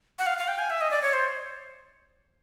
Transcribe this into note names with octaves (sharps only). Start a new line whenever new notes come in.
F#5
F5
F5
G5
G#5
E5
D#5
D5
C#5
C5